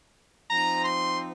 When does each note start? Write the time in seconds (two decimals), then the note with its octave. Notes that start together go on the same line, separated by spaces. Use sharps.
0.50 F3 C4 D#4 A#5
0.84 C6